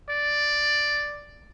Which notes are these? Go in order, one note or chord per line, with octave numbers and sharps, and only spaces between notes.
D5